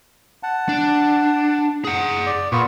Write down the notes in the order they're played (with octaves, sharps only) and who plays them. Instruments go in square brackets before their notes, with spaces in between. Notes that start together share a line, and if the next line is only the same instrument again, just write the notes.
[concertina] F#5 A5
[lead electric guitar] D4
G#4 F#5
[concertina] D5
[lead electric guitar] A#2 [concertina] B3 F4 C#6